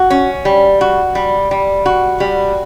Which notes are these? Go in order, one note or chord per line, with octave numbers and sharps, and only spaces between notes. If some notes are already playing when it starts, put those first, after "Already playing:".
Already playing: F#4
C#4
G3
F#4
G3
G3
F#4
G3